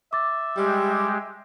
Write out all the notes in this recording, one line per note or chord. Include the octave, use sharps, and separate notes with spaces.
E5 D6 A6
G3 G#3 G4